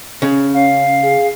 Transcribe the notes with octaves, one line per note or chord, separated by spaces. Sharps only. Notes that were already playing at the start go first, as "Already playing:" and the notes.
C#3
C#4 F5
G#4